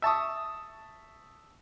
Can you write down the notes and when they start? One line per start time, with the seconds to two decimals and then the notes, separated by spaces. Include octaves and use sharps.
0.02 E5 A5 C#6 D#6